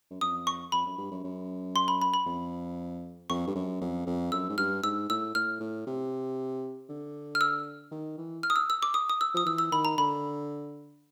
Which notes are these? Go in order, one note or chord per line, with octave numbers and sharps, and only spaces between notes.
F#2
F2 D#6
C#6
F2 B5
F#2
G2
F#2
F#2
C6
B5
B5
B5
F2
F2 C#6
G2
F#2
F2
F2
F#2 E6
G#2
G2 F6
G#2 E6
A2 E6
A2 F6
A2
C3
D3
F6
E6
D#3
E3
F6
D#6
E6
E6
D6
D#6
D#6
E6
F3 D#6
E3 E6
E6
D#3 B5
A#5
D3 B5